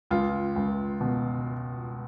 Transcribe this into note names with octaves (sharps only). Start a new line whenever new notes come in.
C#2 F4
C#2
B2